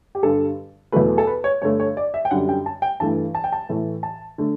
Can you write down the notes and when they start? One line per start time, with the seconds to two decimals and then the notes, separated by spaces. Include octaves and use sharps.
0.15 G4
0.23 G2 D3 G3 A4
0.92 E2 B2 F#3 A3 B4
1.18 A4
1.27 B4
1.44 C#5
1.62 G2 D3 A3 C#5
1.80 C#5
1.97 D5
2.14 E5
2.25 G5
2.31 F#2 D3 G3 F#5
2.49 G5
2.66 A5
2.82 G5
3.00 G2 E3 A3 A5
3.35 A5
3.44 G5
3.52 A5
3.69 A2 E3 A3
4.03 A5
4.38 D3 A3